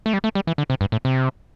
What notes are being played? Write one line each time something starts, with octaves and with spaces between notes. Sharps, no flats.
A3
G3
A3
G3
E3
D3
C3
G2
A2
C3